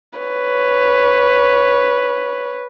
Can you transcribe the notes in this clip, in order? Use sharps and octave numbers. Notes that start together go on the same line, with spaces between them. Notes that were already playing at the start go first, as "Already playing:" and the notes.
B4 C#5